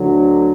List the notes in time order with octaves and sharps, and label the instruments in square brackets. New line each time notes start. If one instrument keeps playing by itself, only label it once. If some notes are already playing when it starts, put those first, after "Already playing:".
Already playing: [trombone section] D2 D3 F#3